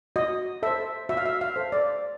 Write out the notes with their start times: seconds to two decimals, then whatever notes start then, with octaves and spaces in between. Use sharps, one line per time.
0.16 F#4 D#5
0.63 A4 C5 E5
1.09 F#4 E5
1.17 F5
1.26 E5
1.41 F5
1.56 A4 C5
1.72 D5